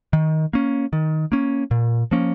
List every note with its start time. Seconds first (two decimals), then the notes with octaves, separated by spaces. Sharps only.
0.13 D#3
0.53 A#3 C#4
0.93 D#3
1.32 A#3 C#4
1.71 A#2
2.11 F3 A#3 C#4